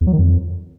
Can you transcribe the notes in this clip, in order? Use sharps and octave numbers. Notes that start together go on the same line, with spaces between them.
E2
F#3
D#3
F2